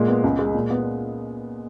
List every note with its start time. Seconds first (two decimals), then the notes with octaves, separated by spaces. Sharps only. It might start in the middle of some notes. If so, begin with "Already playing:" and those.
Already playing: A#2 G#3
0.08 B3
0.24 C#2
0.39 G#3
0.54 A#2
0.70 B3